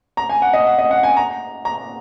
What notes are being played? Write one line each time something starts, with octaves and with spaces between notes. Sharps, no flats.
A#5
G#5
F#5
D#5
F#5
D#5
F#5
G#5
A#5
A#5